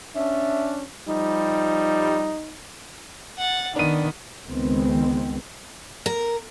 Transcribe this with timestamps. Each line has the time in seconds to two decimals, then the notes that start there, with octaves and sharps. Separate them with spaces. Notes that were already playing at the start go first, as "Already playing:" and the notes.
0.16 C#4 D4 E5
1.08 F3 G3 D#4
3.38 F#5 A6
3.76 D#3 B3 D4 D#7
4.47 C#2 D#3 G#3 B3 C4
6.06 A#4